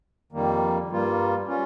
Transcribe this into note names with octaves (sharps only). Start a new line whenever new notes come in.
F2 D#3 G3 A#3
G2 G3 A#3 F4
G3 C#4 F4